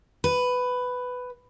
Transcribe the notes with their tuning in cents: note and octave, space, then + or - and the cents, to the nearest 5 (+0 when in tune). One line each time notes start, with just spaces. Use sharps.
B4 +10